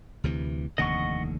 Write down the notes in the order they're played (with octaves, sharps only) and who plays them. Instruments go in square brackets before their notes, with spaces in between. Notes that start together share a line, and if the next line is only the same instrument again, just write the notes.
[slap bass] D2 C3 E3
[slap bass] F1 D#2 D3 [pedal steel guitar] D#5 F#5 C#6